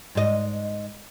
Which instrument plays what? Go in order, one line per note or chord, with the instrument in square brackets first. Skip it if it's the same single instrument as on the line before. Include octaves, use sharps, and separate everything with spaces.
[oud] G#2 D#5